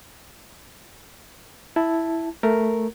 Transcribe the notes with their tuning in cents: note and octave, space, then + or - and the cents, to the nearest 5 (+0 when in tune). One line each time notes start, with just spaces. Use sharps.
E4 +0 A5 +0
A3 +0 A#4 +0